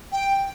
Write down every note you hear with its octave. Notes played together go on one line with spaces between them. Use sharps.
G5